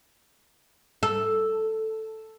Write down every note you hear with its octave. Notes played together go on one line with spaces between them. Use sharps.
A4